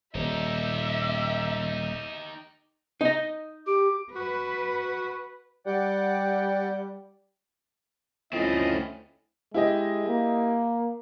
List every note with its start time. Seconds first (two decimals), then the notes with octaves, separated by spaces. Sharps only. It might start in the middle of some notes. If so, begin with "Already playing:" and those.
0.15 D#1 A#2 D#4 G4 D#5 E5
3.01 D#4 D#5
3.67 G4 D6
4.16 F#4 B4
5.66 G3 D5 F#5 G5
8.33 D2 A3 C4 C#4 E4 F4 D#5
9.54 G#3 E4 G4 D#5
10.08 A#3